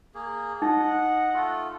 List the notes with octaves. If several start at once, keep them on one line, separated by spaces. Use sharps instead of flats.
A#3 G#4
D#4 D#5 F#5
A3 F4 A4